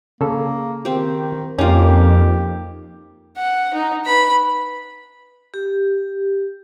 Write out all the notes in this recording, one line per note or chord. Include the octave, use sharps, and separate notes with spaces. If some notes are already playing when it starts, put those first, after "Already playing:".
C#3 A#3 A4
D#3 C4 G4
F2 A#3 C#4 D#4 F4 G4
F#5
D#4
B4 B5
G4